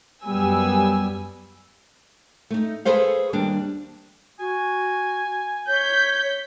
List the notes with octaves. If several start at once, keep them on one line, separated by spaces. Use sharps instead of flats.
F#2 G3 B3 G#5 E6
A3 D#4
G#4 A4 B4 C5 F5
D#2 G3 D4
F#4 G#5
C#5 G6 B6